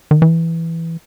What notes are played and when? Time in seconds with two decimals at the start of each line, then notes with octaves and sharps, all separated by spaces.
0.11 D#3
0.22 E3